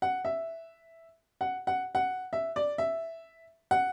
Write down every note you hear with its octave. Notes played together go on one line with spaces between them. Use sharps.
F#5
E5
F#5
F#5
F#5
E5
D5
E5
F#5